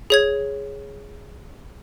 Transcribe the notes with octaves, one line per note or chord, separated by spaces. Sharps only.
G#4 C#5 G#6